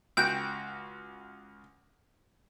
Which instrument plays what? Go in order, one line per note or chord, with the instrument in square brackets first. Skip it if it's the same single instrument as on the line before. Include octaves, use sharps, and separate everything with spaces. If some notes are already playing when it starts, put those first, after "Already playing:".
[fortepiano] C#2 F#4 F#6 [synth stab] G5 D7